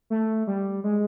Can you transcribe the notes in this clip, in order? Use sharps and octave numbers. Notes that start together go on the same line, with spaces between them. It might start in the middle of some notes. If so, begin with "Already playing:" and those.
A3
G3
G#3